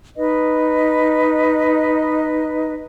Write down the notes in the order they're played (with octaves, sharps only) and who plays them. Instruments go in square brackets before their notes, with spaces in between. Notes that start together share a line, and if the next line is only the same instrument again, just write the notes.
[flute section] D#4 B4 D#5